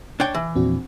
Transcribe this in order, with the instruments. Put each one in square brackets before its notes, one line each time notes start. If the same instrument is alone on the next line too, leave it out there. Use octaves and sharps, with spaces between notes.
[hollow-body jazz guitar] D4 C#5 G5
E3
[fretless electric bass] E2 A#2 F3 [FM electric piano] C4 D4 F#4